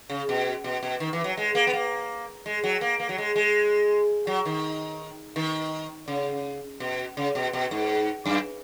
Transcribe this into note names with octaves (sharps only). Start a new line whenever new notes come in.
C#3
B2
B2
B2
D#3
E3
F#3
G#3
A#3
B3
A#3
G#3
F#3
A#3
A#3
F#3
G#3
G#3
F#3
D#3
D#3
C#3
B2
C#3
B2
B2
G#2
F#2